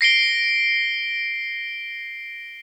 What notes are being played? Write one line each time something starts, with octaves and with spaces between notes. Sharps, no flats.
A#6 C7 D7 G7